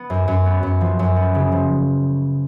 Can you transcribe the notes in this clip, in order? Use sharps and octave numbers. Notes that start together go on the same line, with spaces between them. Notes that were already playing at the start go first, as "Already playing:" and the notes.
Already playing: B3
F#2
F#2
B3
F#2
F3
F#2
B3
C#3
F3